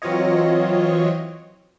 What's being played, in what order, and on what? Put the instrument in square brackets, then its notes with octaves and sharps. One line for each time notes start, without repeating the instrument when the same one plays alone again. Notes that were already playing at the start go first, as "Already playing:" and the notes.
[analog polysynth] E3 F#3 C4 F4 C#5 D#5